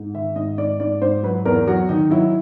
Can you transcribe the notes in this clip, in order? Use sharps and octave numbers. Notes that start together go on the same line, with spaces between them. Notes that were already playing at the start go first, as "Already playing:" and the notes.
Already playing: G#2
D#3 E5
G#2 D#5
G#2 D5
G#2 D5
G#2 C5
F#3 B4
E2 A#4
F#3 F#4
D#3 D#4
F#3 E4